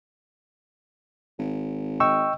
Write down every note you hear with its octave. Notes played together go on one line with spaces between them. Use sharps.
G#1
D#5 G5 C#6 E6